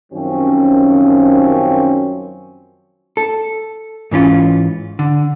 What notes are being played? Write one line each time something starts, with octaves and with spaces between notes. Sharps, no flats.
F#2 D#3 F3 G3 C4 C#4
A4
G#2 E3 C#4 F4
D3